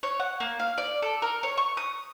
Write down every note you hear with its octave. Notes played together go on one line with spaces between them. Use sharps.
C#5
F#5
A#3
F5
D5
A4
A#4
C#5
C#6
D#6